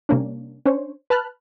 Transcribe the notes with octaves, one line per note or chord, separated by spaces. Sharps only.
C3 G3 A#3 C#4 D4
C#4 D4 C5 C#5
B4 A5 B5 F6 F#6